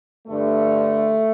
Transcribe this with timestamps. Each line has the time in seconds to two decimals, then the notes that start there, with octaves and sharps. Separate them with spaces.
0.28 G2 D3 A3